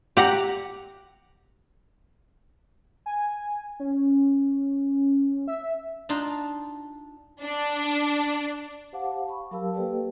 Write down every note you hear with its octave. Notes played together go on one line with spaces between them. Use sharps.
G4 F#5 A#5
G#5
C#4
E5
D4 D#4 F4
D4
G4 C5 F5 F#5 A5 D6
B5 C#6
F#3 G4 A#4 F5 A5 E6
A#3 G4 A4 B4 D5 G5